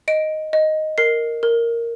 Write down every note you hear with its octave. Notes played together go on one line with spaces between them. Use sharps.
D#5 D7
D#5
A#4 C7
A#4